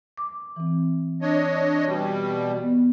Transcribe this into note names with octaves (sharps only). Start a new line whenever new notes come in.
D6
E3 C4
D4 C#5 D#5
B2 G3
B3